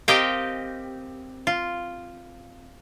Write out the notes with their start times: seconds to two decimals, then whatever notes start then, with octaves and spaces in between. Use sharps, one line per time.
0.08 C4 G4 A#4 D#5 F5 G5
1.47 F4